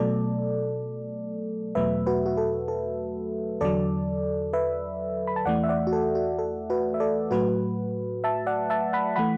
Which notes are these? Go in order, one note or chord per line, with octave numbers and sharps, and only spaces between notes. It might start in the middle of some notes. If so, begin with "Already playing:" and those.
Already playing: B2 F#3 A3 A4 D5
E2 B2 F#3 A3 B4 E5
F#4 B4
F#4
A4
A4
E2 D3 F#3 A4 D5
B4 E5
B5
A5
E2 E3 A3 D5 F#5
E5
D5 F#5
F#4
A4
F#4
A4
F#4 B4
E5
A4 D5
A2 F#3 A3 F#4 B4
E5 A5
D5 F#5
E5 A5
F#5 B5
E3 A3 F#5 B5